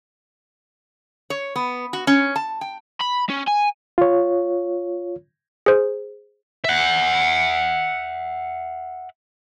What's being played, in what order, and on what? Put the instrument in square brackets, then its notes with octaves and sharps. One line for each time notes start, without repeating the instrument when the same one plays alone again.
[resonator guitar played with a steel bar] C#5
B3
F#4
C#4
A5
G5
[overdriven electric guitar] B5
C#4
G#5
[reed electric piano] F4 C#5
[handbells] G#4 C5
[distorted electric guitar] E5 F#5